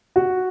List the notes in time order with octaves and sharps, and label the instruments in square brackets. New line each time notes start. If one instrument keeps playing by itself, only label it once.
[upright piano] F#4